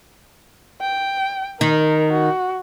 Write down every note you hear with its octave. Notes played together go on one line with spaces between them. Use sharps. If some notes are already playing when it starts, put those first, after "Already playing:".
G5
D#3 A#4
F#4